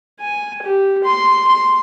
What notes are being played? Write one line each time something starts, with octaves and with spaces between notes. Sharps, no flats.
G#5
G4
C6
C6